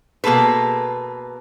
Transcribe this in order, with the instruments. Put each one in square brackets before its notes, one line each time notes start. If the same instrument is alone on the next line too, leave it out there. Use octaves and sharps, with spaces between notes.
[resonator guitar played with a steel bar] B2 A#3 G#4 A4 B4